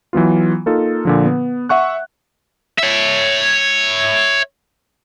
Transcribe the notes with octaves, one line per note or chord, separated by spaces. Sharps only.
E3 F#3 B3 F4
A#3 D#4 F4 A4
A#2 D3 F3
B3
E5 F#5 C#6 F#6
C#5 E5